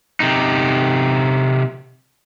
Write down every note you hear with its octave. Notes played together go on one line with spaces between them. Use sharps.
C3 D#4